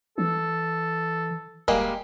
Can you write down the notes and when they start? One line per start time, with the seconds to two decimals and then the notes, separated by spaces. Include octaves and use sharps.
0.18 E3 A4
1.68 D1 G3 G#3 A#3